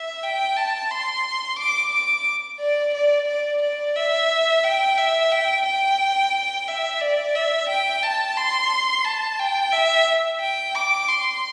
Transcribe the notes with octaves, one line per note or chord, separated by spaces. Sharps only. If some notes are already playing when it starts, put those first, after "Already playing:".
Already playing: E5
G5
A5
C6
D6
D6
D5
D5
D5
D5
E5
G5
E5
G5
G5
E5
D5
E5
G5
A5
C6
A5
G5
E5
G5
D6
C6